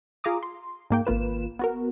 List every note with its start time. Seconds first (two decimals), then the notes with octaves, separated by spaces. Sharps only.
0.24 F4 G#4 F5 A#5 D6 D#6
0.43 C6
0.90 G#2 A#3 G5
1.06 G#1 A#3 F4 B4 E7
1.59 B3 F#4 A#4